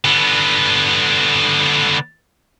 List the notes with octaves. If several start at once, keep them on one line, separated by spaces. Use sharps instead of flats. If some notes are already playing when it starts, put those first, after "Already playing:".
D3 B3